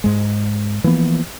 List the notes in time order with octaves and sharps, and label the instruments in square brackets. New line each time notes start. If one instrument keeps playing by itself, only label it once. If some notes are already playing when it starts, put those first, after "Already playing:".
[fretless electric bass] G#2 G#3
E3 F3 A#3 B3